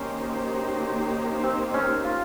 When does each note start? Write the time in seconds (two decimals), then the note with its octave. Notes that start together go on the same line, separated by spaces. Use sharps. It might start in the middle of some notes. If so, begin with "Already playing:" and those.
Already playing: D#3 A#3 C#4 D#4 G4 C5
1.43 C4
1.74 C#4
2.04 F4